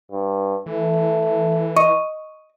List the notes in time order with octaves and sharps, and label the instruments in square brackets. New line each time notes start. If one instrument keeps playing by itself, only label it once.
[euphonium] G2
[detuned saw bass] E3 [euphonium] A3
[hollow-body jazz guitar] D#5 [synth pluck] C#6